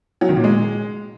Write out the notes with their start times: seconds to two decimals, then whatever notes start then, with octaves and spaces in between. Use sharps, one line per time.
0.21 F#3
0.29 D#3
0.36 A#2
0.44 G#3